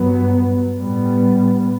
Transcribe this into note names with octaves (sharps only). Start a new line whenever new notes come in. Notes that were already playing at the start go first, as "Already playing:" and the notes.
Already playing: G2 F#3 B3
A2 G3 B3